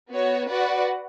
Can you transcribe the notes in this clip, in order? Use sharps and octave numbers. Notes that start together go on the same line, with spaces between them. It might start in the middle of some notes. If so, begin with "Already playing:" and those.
B3 F#4 C#5
F#4 B4 D5 F#5